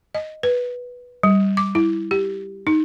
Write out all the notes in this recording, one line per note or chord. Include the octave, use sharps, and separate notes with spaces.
D#5
B4
G3
D6
E4
G4
D#4